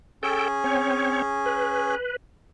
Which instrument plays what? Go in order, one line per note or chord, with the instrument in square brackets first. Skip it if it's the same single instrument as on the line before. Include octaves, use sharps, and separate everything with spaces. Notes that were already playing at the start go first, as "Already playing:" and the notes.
[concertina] C#4 G#4 [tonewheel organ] A4 G5
[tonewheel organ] C4 C#5
B4